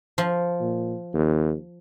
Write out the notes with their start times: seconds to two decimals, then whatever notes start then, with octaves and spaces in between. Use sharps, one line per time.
0.18 F3
0.60 A#2
1.14 D#2